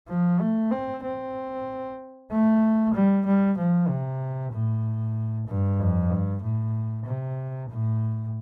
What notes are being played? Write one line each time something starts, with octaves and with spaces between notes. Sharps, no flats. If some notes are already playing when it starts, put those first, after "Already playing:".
F3
A3
C4
C4
A3
G3
G3
F3
C3
A2
G2
F2
G2
A2
C3
A2